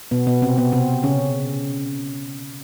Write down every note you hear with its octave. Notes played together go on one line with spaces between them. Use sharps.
B2 B3
B2 B3
C3 C4
B2 B3
C3 C4
C#3 C#4